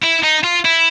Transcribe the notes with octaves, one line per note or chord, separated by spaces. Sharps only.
E4
D#4
F4
E4